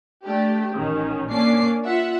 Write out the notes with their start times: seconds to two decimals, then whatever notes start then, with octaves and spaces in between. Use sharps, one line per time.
0.24 A3 D4 G4
0.73 A1 D#3 C#4
1.30 A#3 C#4 D4 D6 C7
1.83 F4 E5 F#5